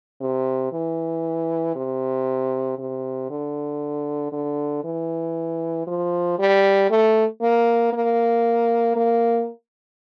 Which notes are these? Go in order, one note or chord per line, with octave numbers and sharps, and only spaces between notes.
C3
E3
C3
C3
D3
D3
E3
F3
G3
A3
A#3
A#3
A#3